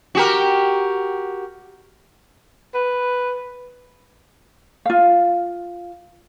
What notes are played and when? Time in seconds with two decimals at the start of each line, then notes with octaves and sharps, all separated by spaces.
0.15 F#4 G4 A#4
2.74 B4
4.86 F4 F5